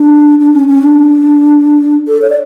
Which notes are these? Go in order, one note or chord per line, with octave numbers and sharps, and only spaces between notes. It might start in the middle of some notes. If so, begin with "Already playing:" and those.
Already playing: D4
D4
C#4
C#4
D4
A4
C#5
D5